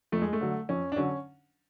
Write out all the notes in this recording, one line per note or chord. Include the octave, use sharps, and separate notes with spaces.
F2 A3
G#3
A3
D3 F#3
F2 C#4
D4
D3 F#3 C#4